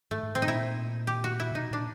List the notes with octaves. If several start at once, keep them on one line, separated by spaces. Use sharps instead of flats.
G#2 A3
G#2
A2 C4
D#4
A#2 E4
G4
F#4
E4
C3
B2 D#4
A#2 D4